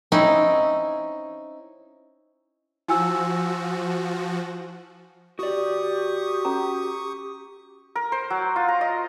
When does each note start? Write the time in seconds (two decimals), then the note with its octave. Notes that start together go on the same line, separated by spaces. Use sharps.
0.12 C4 C#4 D#4 E4
2.88 F3 E4 F#4 G#5 E6
5.39 F#4 G4 D5 C#6 D#6
6.45 C#4 A4 A#5
7.95 A#4
8.12 C5
8.30 F#3
8.56 F4
8.68 A#5
8.81 D#5